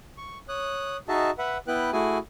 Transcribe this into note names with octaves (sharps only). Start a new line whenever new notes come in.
C#6
C#5 D#6 F#6
D#4 F#4 G#4 D#5 E5 A5
B4 E5 F#5
B3 E4 B4 G5 F#6
A3 E4 F#4 G#4 G#5